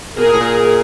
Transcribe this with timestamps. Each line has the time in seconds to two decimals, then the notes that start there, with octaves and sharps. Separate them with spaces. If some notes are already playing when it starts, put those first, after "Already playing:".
0.17 B2 G#4 A#4
0.26 A#2
0.33 A2
0.40 A#2